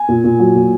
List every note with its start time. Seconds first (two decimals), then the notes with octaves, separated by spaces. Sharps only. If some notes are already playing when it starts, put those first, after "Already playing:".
Already playing: G#5
0.08 A#2
0.24 A#2
0.39 F#3
0.55 A#2